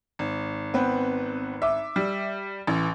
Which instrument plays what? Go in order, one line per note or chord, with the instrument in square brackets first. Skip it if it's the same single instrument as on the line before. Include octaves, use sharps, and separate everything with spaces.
[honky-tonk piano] G#1
[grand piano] B3 C4 B4
E5 D6
[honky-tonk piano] G3
[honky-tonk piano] A1 [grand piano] E3